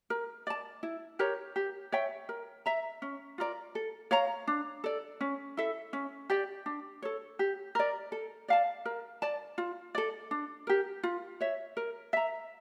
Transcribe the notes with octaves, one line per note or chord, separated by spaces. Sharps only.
A#4
D5 A5
E4
G4 A#4 C#5
G4
C#5 E5 G5
A#4
E5 A#5
C#4
F4 A#4 D5
A4
C#5 F5 A#5
D4
A4 D5
C#4
E4 A4 E5
C#4
G4 D5 G5
D4
A4 C#5
G4
A#4 D5
A4
D5 F5 A5
A#4
D5 A5
F4
A4 D5
D4
G4 A#4
F4
C#5 E5
A#4
E5 A#5